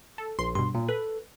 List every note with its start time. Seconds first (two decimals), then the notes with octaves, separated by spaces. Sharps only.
0.18 A4
0.39 A#1 C6
0.55 G2 B2 C6
0.75 A#2
0.89 A4 B4